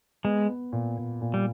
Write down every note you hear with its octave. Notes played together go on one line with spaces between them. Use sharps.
G#3 B3
B3
A#2
A#2
A#2
G3